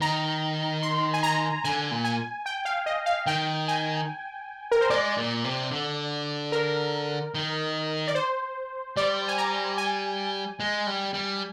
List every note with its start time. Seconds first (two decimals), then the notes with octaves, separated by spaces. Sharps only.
0.01 D#3 A#5
0.83 C6
1.14 G#5
1.23 A#5
1.64 D3 G#5
1.91 A#2
2.04 G#5
2.46 G5
2.65 F5
2.86 D#5
3.06 F5
3.26 D#3 G5
3.68 G#5
4.72 A#4
4.81 C5
4.90 G#3 D5
5.17 A#2
5.44 C3
5.71 D3
6.52 A#4
7.35 D#3
8.08 D5
8.15 C5
8.97 G3 D5
9.28 G#5
9.38 A#5
9.78 G#5
10.60 G#3
10.87 G3
11.14 G3